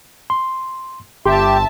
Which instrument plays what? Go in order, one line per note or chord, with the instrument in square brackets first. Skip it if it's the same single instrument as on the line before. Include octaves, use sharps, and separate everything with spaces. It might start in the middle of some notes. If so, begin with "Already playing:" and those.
[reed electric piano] C6
[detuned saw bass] G1 [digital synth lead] G4 [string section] E5 A5 [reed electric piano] C6